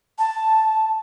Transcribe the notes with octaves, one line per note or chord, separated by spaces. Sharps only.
A5